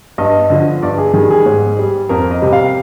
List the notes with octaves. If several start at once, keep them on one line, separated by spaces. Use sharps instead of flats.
G2 D#5
D3 F3
G2 D5
G#4
D#3 G3 G#4
G#4
G#2
G3
F2 A#4
D#5
C3 G3
F5